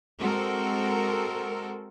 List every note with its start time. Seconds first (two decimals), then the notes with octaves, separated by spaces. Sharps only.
0.20 G#3 C4 F#4 A4 A#4